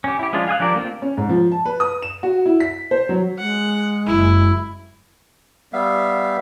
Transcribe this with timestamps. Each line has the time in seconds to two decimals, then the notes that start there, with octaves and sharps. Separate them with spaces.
0.04 C#4 G4
0.19 E4 G4
0.33 F3 G#3 C#4 D4 F4
0.48 F5 G#5 D#6 F#6
0.60 F3 D4 G4 A#4 D5
0.74 A3 A#3 C4 F4
1.02 C#4
1.17 G#2
1.29 F3
1.52 A5
1.66 B4
1.80 D#6
2.02 E7
2.23 F#4
2.46 E4
2.60 B6
2.91 C5
3.09 F#3
3.40 G#3 F#5
4.07 F#1 E4
5.73 G3 B3 E5 F5